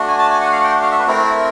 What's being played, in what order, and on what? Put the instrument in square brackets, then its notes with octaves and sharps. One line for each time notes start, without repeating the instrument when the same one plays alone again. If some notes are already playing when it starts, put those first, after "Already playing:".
Already playing: [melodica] A3 D4 F#4
G#5
A5
G#5
F#5
F5
G5
F#5
F5
E5
B4
A3 C4 E4 A#4
A#4